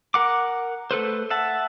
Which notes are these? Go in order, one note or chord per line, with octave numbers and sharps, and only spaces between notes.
A#4 F#5 D6
A3 A4 B4 C5
E5 F#5 A5